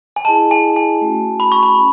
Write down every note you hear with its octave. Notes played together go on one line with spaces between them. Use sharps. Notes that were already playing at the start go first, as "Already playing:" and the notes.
G#5
E4 G#4 D#5 A5
G#5
G#5
A3 C#4 F#4
B5
C#6
B5
C#4